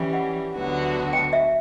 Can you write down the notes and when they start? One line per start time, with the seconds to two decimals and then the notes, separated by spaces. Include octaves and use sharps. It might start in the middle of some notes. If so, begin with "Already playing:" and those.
Already playing: E3 G3 C#4
0.13 F#5
0.53 D2 D3 F#3 B3 F#4
1.13 G5
1.33 E5